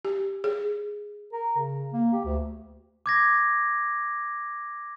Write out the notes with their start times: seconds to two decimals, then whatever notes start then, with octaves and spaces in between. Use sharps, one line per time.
0.05 G4
0.44 G#4
1.33 A#4
1.57 C#3
1.93 A#3
2.13 G4
2.25 D2
3.06 D6 G#6 A#6